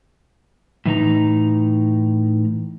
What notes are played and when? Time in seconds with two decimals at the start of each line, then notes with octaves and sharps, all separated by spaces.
0.86 A2 E3 D#4 A#5